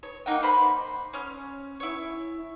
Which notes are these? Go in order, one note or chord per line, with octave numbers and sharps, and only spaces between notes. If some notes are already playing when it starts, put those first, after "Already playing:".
C#5
A#3 D#4 F#5 G5
C5 B5 G6
C#4 F6
E4 C#5